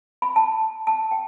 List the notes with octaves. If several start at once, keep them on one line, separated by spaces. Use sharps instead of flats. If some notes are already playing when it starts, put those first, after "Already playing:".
B5
A5
A5
G5